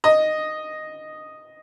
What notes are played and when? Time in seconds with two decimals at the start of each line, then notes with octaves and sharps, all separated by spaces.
0.04 D#5